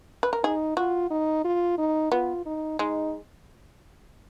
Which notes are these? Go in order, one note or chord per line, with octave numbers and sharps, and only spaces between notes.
B4
A#4
D#4 G#4
F4 F#4
D#4
F4
D#4
B3 F4
D#4
G#3 D#4